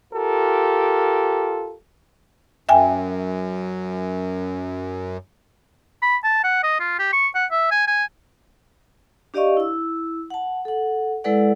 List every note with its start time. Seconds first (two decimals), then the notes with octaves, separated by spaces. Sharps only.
0.13 F4 G4 A4 A#4
2.69 F#2 E5 G5 G#5
6.02 B5
6.24 A5
6.44 F#5
6.63 D#5
6.80 F4
6.99 G4
7.13 C#6
7.35 F#5
7.52 E5
7.71 G#5
7.87 G#5
9.34 D4 G4 D5 D#5 F5 C#6
9.57 E4 E6
10.30 F#5 A5
10.65 A4 F#5
11.24 G#3 E4 A4 B4 D5 F#5